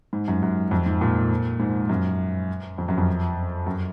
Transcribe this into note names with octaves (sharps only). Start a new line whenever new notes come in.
G#2
F#2
F#2
F2
G#2
A#2
G#2
F#2
F2
F#2
F2
F#2